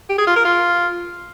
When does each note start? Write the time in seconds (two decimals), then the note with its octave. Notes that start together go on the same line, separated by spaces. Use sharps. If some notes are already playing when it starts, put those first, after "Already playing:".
0.09 G4
0.18 G#4
0.27 F4
0.36 A#4
0.45 F4